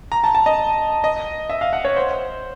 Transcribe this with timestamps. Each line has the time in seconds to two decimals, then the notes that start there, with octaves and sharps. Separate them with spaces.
0.12 A#5
0.24 A5
0.35 A5
0.46 D#5
1.04 D#5
1.50 E5
1.61 F5
1.73 F#5
1.85 C#5
1.96 C5